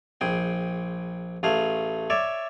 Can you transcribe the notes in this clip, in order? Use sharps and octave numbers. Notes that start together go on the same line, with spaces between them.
A#1 G#4 G5
A1 A3 G#4 F5
C#5 D5 E5